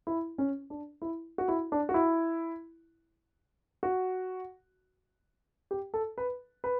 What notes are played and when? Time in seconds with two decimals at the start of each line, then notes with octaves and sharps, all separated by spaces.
0.07 E4
0.38 C#4
0.70 D4
1.02 E4
1.38 F#4
1.48 E4
1.72 D4
1.89 F#4
1.94 E4
3.83 F#4
5.71 G4
5.94 A4
6.18 B4
6.64 B4